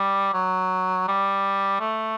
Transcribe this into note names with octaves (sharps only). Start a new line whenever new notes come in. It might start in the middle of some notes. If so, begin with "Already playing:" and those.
Already playing: G3
F#3
G3
A3